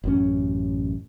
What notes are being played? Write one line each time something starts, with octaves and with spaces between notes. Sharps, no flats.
A1 F#2 C#4